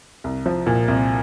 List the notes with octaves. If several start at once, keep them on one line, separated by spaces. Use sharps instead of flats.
C2
F3
A#2
C2